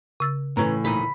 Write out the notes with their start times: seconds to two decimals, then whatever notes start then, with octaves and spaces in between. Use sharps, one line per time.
0.20 C#3 E6 A6
0.57 A2 E3 C#4 B4 A#5
0.85 C2 A#2 D#4 B5